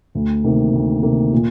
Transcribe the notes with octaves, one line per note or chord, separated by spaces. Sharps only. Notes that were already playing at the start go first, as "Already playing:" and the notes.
D2
C3 D#3 A#3
D2
C3 D#3 A#3
A#2